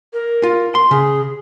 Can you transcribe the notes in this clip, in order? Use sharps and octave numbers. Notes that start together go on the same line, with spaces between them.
A#4
F4
C6
C#3 G#4